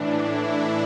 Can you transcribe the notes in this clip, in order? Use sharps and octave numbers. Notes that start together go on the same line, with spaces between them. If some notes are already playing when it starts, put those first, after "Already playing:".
Already playing: A2 E3 D4
E4